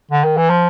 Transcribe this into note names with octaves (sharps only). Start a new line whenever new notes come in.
D3
D#3
E3
F3